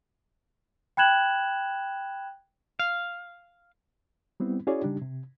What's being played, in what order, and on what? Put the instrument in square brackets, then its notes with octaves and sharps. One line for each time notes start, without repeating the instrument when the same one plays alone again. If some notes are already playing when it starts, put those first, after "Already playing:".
[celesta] G5 B5 F#6 G#6 E7 F#7
[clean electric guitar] F5
[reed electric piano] G3 B3 C4 E4
C#4 E4 F#4 G#4 C#5 D5
C#3 G3 D4 D#4 G4
C3